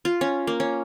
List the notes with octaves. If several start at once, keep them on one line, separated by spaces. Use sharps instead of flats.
F4
C#4
A#3
C#4